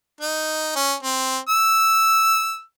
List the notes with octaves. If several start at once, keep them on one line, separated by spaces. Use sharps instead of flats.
D#4
C#4
C4
E6